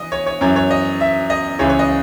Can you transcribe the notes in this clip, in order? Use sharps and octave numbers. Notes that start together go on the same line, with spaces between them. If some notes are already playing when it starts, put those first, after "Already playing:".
Already playing: E3 D#5
C#5
C#5
F#2 E3 C#5
C#5
D#5
E5
D#5
C#2 C#3 E3 C#5
C#5
D#5